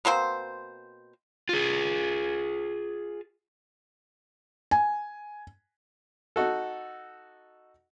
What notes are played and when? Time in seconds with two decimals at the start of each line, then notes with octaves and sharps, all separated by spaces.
0.05 B2 A#3 C4 C5
1.49 F4 G#4
4.71 G#5
6.36 D#4 F#4 A4